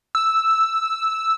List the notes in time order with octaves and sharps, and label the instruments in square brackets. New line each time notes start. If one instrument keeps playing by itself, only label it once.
[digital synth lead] E6